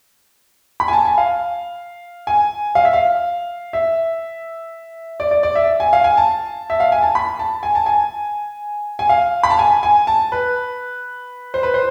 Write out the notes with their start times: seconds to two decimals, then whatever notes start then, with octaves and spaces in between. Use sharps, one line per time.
0.80 B5
0.88 G#5
0.93 A5
1.05 G#5
1.18 F5
2.27 G#5
2.75 F5
2.85 E5
2.93 F5
3.73 E5
5.20 D5
5.31 D5
5.43 D5
5.55 E5
5.80 G#5
5.93 F5
6.04 G#5
6.17 A5
6.70 E5
6.80 F5
6.92 G#5
7.03 A5
7.15 B5
7.39 A5
7.63 G#5
7.75 A5
7.86 G#5
8.99 G#5
9.09 F5
9.43 B5
9.50 A5
9.59 G#5
9.83 G#5
10.07 A5
10.32 B4
11.54 C5
11.63 B4
11.74 C5